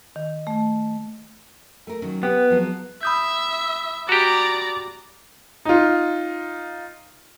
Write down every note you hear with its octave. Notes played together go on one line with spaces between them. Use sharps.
D#3
A3
A3 A#4
D#3 F#3 C#4
B3 G4
F3 F#3 G#3
E5 B5 D#6 G6
F#4 G4 D5 A#5
D#4 F4